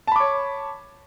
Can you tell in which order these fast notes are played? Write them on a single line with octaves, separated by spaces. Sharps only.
A5 B5 D6 C#5